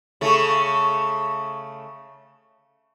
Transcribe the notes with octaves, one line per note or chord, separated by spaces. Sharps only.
C#3 A3